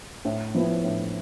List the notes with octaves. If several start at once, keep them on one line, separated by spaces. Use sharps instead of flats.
A2
F3 B3 E4
A2